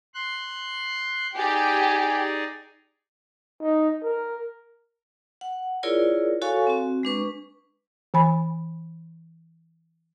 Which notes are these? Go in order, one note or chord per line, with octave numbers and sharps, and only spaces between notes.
C6 F#6
D#4 G4 G#4 D5 G#5
D#4
A#4
F#5
E4 F4 G#4 A#4 C#5 D5
F#4 A4 C#5 F5 G#5 C#6
C4 F#4
G#3 D4 B4 C#6
E3 G#5 B5